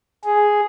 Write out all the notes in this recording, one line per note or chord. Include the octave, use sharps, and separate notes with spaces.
G#4